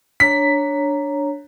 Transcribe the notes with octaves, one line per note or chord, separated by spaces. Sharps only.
D4 C#5 A#5 B6